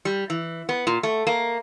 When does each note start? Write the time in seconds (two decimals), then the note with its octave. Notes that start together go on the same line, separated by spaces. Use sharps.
0.05 G3
0.30 E3
0.69 B3
0.87 A#2
1.03 A3
1.27 A#3